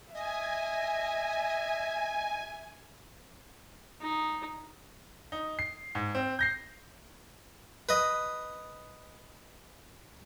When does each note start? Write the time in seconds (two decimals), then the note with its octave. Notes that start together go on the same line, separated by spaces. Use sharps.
0.13 D#5 E5 G#5
4.01 D#4
5.32 D#4
5.59 C7
5.95 G#2
6.15 C4
6.39 G6 A#6 C7
7.89 B4 D#5